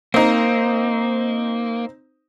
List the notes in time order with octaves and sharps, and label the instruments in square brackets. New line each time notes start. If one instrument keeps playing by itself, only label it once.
[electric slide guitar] A#3 [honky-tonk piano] C4 D#4